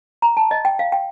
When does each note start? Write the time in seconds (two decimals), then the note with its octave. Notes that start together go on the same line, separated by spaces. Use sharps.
0.22 A#5
0.37 A5
0.51 D#5
0.65 G5
0.79 F5
0.92 G5